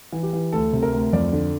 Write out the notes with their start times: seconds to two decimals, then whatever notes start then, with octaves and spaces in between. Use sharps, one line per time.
0.13 E3
0.23 G4
0.33 E3
0.53 D2 A4
0.73 C3
0.82 A#4
0.93 D2
1.13 F2 D5
1.33 D3